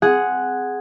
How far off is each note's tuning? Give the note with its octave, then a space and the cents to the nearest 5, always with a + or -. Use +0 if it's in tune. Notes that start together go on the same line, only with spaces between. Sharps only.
C4 -20 G#4 +0 F#5 +0